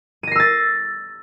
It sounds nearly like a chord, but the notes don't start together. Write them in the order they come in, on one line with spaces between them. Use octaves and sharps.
D#7 A#6 C7 E6 A6